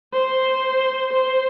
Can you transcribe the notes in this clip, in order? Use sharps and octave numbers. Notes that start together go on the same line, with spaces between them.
C5
C5